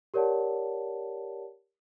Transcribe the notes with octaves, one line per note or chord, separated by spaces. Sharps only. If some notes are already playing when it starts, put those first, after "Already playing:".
G4 A#4 C#5 D5 F#5 A5